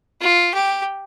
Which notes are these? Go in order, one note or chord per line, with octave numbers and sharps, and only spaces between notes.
F4
G4